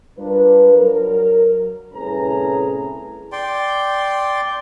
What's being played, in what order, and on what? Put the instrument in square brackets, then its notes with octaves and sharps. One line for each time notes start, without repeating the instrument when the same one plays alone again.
[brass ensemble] G3 D4 F4 A#4 B4
F#3 A#4
C2 A2 C#4 G#4 B4 A#5
[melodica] D5 G5 C6